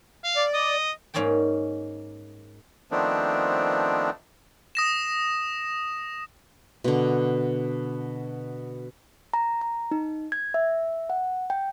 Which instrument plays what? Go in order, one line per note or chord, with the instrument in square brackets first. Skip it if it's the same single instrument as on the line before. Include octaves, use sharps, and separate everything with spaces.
[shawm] F5
[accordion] D5
[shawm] D#5
[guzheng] G#2 A#3 C#4 D#4 D5 G5
[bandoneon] D#3 F3 A3 B3 C4 D4
[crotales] D#6 A#6 E7
[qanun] B2 D3
[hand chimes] A#5
A#5
D#4
G#6
E5
F#5
G5